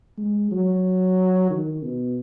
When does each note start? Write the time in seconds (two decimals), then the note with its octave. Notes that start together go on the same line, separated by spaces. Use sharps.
0.18 G#3
0.51 F#3
1.50 D#3
1.83 B2